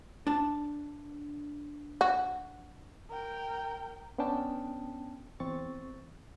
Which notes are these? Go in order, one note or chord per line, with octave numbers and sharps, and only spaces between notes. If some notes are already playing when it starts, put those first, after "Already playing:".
D4 A5
F#4
A#4 G5
B3 C#4 D4 G5 A5
E2 C4 C#6 A6